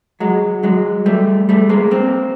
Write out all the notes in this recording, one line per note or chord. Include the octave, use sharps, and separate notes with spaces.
F#3 G#3
F#3 G#3
G3 A3
G3 A3
G#3 A#3
A#3 C4